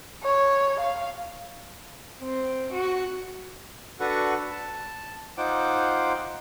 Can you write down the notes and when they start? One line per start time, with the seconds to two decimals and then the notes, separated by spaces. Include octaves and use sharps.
0.23 C#5
0.80 F5
2.20 C4
2.72 F#4
4.00 D4 F#4 A4 B4 F#5 C#6
4.51 A5
5.37 D#4 F4 C5 F#5 G5 D6